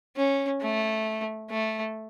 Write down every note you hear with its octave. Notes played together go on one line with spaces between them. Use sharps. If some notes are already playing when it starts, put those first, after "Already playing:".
C#4
A3
A3